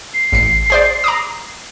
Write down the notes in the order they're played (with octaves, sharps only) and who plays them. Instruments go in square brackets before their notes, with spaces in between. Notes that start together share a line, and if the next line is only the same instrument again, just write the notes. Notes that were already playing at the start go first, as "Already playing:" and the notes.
[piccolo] C7
[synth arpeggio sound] A1 C#7
G#4 C5 D5
A#5 D6 D#6